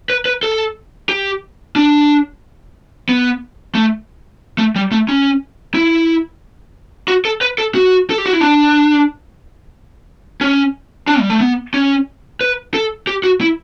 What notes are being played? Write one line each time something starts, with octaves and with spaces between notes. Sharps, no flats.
B4
B4
A4
G4
D4
B3
A3
A3
G3
A3
C#4
E4
F#4
A4
B4
A4
F#4
A4
G4
F#4
E4
D4
C#4
D4
G3
A3
B3
C#4
B4
A4
G4
F#4
E4